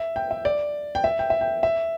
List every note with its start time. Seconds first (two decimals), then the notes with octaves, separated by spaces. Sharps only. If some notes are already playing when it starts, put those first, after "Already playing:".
Already playing: E5
0.16 G5
0.31 E5
0.45 D5
0.95 G5
1.04 E5
1.19 G5
1.30 E5
1.41 G5
1.63 E5